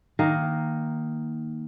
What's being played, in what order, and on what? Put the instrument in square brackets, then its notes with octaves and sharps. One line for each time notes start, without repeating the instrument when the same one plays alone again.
[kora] D#3 A#3